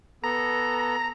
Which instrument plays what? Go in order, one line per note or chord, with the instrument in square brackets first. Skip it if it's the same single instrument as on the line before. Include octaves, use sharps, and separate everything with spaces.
[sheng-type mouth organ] B3 A4 [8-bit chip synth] A#5